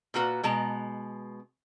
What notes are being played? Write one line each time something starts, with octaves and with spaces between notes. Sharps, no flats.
A#2 A#3 F#4 B4
B2 G#3 A5 A#5